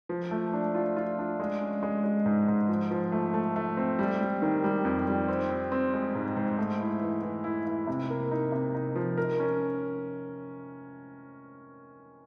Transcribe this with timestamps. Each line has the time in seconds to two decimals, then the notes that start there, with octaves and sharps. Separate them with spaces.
0.09 F3
0.31 A3
0.53 D4
0.75 F4
0.96 F4
1.18 D4
1.40 G#3
1.61 C#4
1.83 G#3
2.04 G#3
2.26 G#2
2.48 G#2
2.69 F3
2.91 F3
3.12 A3
3.34 A3
3.56 A3
3.77 C4
3.99 G3
4.21 G3
4.42 D#3
4.64 G3
4.85 F2
5.07 G3
5.28 C4
5.50 C4
5.72 C4
5.94 G#3
6.15 G#2
6.37 G#2
6.58 A3
6.80 E4
7.01 E3
7.22 E3
7.44 E4
7.66 E4
7.87 C3
8.10 A#3
8.31 D#4
8.52 C3
8.74 D#4
8.96 F3
9.17 A#4
9.40 C#4